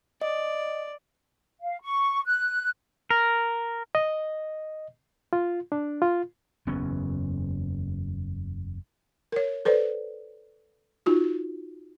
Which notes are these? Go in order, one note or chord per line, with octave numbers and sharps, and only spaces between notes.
D5 D#5
F5
C#6
F#6
A#4
D#5
F4
D4
F4
F#1 E2 B3 C#4
A#4 C#5
A4 B4 C5 D5
D#4 F4 F#4